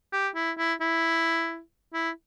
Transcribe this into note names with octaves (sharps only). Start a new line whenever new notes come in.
G4
E4
E4
E4
E4